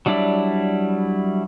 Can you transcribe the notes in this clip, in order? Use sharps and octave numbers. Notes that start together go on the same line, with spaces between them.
F#3 G3 D4 E4 D5